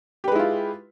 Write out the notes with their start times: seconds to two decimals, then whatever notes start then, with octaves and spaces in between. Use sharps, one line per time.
0.24 G4
0.28 B4
0.32 G#3
0.35 E4
0.39 F4